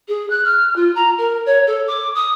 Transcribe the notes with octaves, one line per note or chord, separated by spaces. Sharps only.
G#4
F#6
F6
F4
A#5
A#4
C#5
A4
D6
D#6